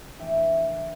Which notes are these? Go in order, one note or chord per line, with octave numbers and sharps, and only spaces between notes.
A2 E3 A3 D4 E5 G5
A2 E3 A3 D4